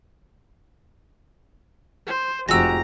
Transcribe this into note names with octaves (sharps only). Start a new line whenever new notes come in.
C5
F1 F2 G#3 F#4 G4 A#5 E6 A#6